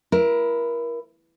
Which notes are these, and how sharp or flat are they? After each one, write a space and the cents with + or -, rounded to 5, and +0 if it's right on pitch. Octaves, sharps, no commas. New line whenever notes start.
E4 +15 A#4 +30